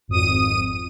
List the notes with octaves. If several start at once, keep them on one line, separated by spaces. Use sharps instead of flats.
G#1 F2 D#6 D#7